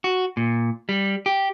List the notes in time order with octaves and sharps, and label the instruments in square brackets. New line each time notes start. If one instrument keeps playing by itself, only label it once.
[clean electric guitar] F#4
A#2
G3
G4